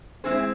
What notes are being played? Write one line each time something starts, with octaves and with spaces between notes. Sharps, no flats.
G#3 C4 E4 G#4 C5